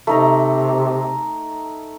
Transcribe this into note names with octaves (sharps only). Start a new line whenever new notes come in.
C3 A3 D#4 A#5